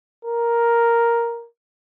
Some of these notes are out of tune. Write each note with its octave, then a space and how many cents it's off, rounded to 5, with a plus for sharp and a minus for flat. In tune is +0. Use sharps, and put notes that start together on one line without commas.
A#4 +5